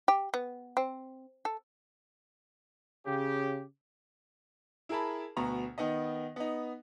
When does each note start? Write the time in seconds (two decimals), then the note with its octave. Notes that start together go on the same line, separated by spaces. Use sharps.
0.08 G4
0.34 B3
0.77 C4
1.45 A4
3.06 C#3 G4
4.89 E4 G#4 A#4 A5 B5
5.37 D2 B2 B3 A#5
5.78 D#3 B3 D#4 D#5
6.36 B3 D#4